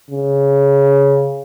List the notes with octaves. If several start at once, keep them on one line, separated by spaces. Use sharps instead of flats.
C#3